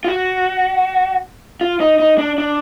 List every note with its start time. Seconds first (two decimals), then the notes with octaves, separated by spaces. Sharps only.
0.04 F4
0.08 F#4
1.61 F4
1.80 D#4
2.00 D#4
2.18 D4
2.38 D4